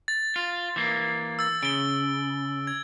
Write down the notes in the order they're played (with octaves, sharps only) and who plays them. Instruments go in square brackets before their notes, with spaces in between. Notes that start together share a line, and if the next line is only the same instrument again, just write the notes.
[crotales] A6
[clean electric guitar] F4
E3 A#3
[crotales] E6 A6
[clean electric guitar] C#3 [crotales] D7 G7
[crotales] G#6